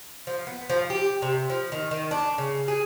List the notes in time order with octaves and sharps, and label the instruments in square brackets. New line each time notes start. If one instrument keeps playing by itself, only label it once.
[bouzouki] F3
B3
F3
G4
C3
F3
D#3
D#3
D4
C#3
G#4